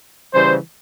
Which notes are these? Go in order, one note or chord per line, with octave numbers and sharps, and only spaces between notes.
C#3 E3 G3 C5